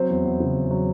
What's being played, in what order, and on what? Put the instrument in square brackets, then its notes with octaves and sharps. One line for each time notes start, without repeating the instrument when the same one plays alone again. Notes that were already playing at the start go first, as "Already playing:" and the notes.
Already playing: [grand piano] F#3 C4 C5
E2
E2
C#3
E2
F#3